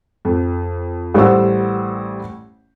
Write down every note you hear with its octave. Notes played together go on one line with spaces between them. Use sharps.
F2
A1 G3 C5 F#5 E6